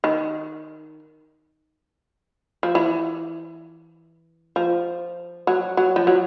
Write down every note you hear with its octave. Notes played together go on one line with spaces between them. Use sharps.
D#3
F3
E3
F3
F#3
F#3
F3
F#3